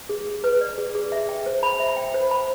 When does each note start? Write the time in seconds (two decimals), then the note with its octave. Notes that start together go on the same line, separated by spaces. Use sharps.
0.09 G#4
0.27 G#4
0.44 B4
0.61 D5
0.78 G#4
0.95 G#4
1.12 E5
1.29 G5
1.46 C5
1.63 B5
1.80 E5
1.97 G5
2.14 C5
2.31 B5